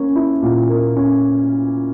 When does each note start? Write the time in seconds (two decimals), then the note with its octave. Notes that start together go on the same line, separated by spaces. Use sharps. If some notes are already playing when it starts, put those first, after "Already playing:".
Already playing: A#3 C#4
0.16 E4
0.42 A#2
0.69 A#3
0.96 C#4